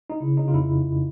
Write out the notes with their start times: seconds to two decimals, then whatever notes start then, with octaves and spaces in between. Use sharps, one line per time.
0.10 D#4
0.20 C#3 E4
0.36 C#3 D#4
0.48 F4
0.53 F2 E4